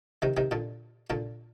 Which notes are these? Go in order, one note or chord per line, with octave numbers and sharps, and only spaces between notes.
C3 D#3
C3 D#3
A#2 D3
A#2 D3